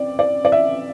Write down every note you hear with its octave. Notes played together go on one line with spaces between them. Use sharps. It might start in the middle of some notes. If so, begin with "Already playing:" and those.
Already playing: C4 D5
D5
D5
E5